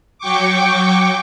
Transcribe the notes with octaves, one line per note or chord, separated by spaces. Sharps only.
F#3 G5 C#6 D6